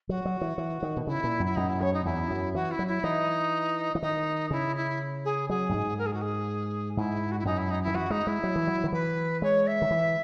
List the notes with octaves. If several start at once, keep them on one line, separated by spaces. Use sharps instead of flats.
F#3 F#4
F#3
E3
E3
D#3
B2
C#3 E4
A#2
F#2
E4
F#2 D#4
E4
F#2 C#5
D#4
E2 E4
F#2
E3 F#4
E4
F#3
E4
E3 D#4
E3
D#3 D#4
C#3 E4
E4
G#4
F#3 G#4
F#2
G#2
A#4
G#4
F#4
G#4
G#2 E4
F#4
E4
F#2 D#4
E4
D#4
D#3 E4
E3 F#4
G#3 D#4
G#3 E4
F#3
E3
F#3
D#3
E3 B4
G#3 C#5
E5
D#3
E3